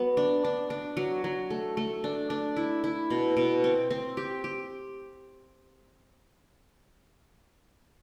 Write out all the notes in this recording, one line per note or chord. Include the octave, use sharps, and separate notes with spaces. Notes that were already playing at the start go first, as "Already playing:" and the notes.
Already playing: F#3 B3
D4
D4
D4
F#3
F#3
A3
A3
D4
D4
E4
E4
B2
B2
C4
C4
G4
G4